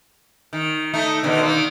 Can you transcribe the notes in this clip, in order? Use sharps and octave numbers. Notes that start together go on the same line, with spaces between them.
D#3
A3 D#4
B2 D3 D#3
D#3 A#3